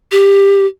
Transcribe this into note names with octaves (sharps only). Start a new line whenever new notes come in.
G4